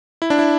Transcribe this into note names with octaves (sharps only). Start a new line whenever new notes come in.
E4
D4
E4